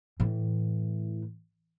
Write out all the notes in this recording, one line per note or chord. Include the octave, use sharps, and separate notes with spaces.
A2 E3